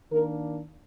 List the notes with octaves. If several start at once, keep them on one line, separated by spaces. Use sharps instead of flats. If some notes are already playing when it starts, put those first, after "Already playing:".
D#3 A#3 D4 A#4